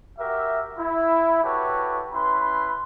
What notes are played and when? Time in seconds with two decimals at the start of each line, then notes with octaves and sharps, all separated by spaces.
0.19 F#4 G4 A#4 E5
0.78 E4
1.43 E4 F#4 G4 A4 B4 C#5
2.12 C#4 E4 B4 B5 C6